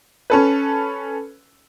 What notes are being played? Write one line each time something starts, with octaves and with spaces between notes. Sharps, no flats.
C#4 A4 B4